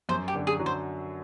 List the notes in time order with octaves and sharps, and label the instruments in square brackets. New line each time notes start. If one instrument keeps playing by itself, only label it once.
[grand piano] F#2 [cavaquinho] C5
[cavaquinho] G4
[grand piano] D3
[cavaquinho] G#4
[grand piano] F#3
[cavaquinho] C5